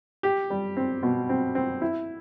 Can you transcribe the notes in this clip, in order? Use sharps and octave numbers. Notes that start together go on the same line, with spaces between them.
G4
G3
C4
B2
C4
C4
E4